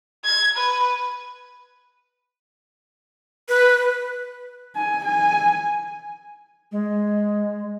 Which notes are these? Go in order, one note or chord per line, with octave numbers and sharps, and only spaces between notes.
G#6
B4
B4
G#5
G#5
G#3